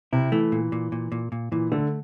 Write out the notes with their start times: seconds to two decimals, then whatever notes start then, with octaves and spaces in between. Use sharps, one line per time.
0.13 C3 E4
0.32 E3 A3
0.52 A#2
0.72 A#2
0.92 A#2
1.12 A#2
1.32 A#2
1.52 A#2 E3
1.72 D3 A3